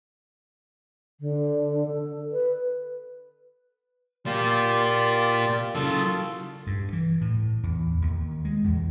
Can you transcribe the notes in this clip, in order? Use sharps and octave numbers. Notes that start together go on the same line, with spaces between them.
D3
A4
B4
A#2 A#3 F4 G4 D5
C#3 F#3 F4 A4
G2
E3
A2
E2
D#2
G#3
E2